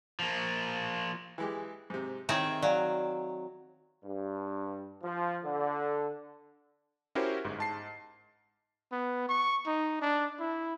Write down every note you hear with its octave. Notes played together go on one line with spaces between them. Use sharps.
F3 A#3
E3 G#3 G4
G#2 C3
D#3 C4 E4 G#4 C#5 G5 G#5
F#3 D5 F5 G#5
G2
F3
D3
C#4 E4 F#4 G4 A#4 C5
G1 G#2
G#2 A5 C7
B3
C#6
D#4
D4
E4